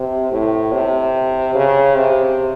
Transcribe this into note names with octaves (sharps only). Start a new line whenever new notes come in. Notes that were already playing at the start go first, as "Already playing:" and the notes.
Already playing: C3
A2
C3
C#3
C3